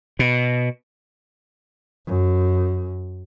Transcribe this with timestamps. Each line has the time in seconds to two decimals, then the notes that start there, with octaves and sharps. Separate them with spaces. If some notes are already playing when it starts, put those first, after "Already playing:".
0.19 B2
2.07 F#2